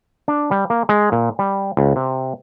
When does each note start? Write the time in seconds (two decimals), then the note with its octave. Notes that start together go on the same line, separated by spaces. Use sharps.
0.28 D4
0.51 G3
0.70 A#3
0.89 G#3
1.12 A#2
1.39 G3
1.77 C#2
1.96 C3